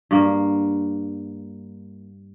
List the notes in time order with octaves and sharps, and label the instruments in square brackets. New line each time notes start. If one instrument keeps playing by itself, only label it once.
[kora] G2 A#3